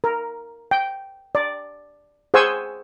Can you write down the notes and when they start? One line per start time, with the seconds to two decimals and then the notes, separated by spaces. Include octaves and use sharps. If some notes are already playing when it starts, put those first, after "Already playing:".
0.04 A#4
0.71 G5
1.35 D5
2.34 G#4 C5 F#5 G#5 C#6 E6